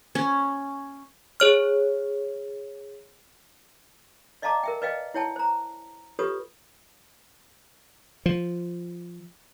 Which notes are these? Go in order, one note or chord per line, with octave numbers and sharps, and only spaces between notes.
C#4
G#4 C#5 F6
D5 D#5 F5 A5 A#5 D6
A#4 E5 G5
B4 D5 D#5 F5 G5
E4 C#5 G5 A5
C5 A#5
F4 G4 A4 B4 C#5 D#6
F3